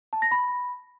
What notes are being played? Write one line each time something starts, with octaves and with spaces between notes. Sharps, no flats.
A5
A#6
B5